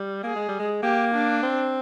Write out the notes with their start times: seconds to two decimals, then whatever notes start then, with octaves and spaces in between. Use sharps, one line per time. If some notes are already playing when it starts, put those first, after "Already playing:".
Already playing: G3
0.23 A#3 G#4
0.35 G#3
0.48 G3
0.60 G#3
0.83 A#3 G4
1.13 D4
1.43 C4